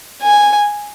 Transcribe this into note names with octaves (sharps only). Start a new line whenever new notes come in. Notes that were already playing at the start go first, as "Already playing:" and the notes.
G#5